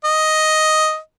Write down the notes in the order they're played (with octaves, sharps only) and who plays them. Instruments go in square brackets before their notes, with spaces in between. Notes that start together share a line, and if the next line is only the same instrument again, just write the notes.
[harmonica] D#5